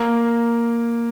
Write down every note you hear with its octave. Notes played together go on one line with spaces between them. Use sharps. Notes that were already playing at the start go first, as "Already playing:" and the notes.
Already playing: A#3